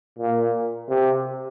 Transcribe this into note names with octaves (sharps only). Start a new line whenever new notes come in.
A#2
C3